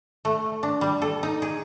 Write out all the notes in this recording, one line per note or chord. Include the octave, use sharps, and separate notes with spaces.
A3
D4
G3
A4
D#4
G#4